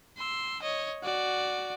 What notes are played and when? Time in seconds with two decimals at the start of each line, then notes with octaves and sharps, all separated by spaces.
0.17 C6 E6
0.62 C#5 D#5
1.03 F#4 D5